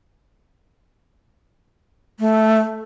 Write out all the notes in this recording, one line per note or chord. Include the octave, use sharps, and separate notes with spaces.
A3